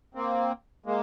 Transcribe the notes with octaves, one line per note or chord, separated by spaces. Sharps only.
A#3 C4
G#3 A#3